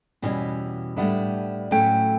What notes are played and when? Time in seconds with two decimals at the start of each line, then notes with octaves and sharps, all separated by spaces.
0.22 E2 B2 G3 C#4 E4
0.97 A2 G3 B3 D4 E5
1.71 A2 F#3 A3 C#4 E4 G5